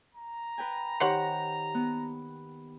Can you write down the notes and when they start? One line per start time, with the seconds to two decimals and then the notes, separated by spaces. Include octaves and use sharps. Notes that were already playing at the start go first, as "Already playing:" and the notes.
0.15 A#5
0.58 B4 G5 G#5
1.00 D#3 G4 C5 C#5 F#5
1.74 B3